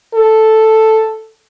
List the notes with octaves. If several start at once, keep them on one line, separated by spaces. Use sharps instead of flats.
A4